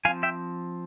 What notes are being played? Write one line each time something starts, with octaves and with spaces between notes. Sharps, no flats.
F3 C4 F5 G#5
E5 G5